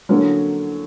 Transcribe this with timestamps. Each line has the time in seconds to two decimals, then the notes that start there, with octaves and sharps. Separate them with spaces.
0.09 D3 F#3 A#3 C#4